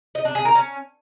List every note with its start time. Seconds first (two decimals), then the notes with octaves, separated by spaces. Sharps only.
0.15 D#5
0.25 D4
0.35 G#4
0.45 A#4
0.55 C#4